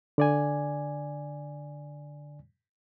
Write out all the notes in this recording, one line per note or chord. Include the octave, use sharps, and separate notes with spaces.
D3 D5 G#5